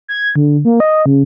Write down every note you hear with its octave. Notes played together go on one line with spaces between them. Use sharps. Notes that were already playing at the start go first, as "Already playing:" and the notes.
G#6
D3
A#3
D#5
C#3